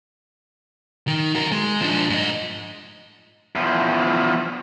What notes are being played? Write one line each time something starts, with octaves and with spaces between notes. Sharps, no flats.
D#3
F#4 A#4
G#3
F3 D4
G#2 D#5
E2 F3